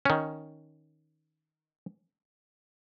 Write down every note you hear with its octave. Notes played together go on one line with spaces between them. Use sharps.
D#3 C#4